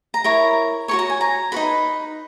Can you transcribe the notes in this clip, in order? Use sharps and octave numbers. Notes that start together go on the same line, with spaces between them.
A#5
E4 A#4 C#5 A#5
F#4 A#4 C#5 C#6
A#5
G#5
A#5
D#4 F#4 B4 B5